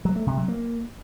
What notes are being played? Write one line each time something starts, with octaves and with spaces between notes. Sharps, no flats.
F#3
A3
C3
F#3
A#3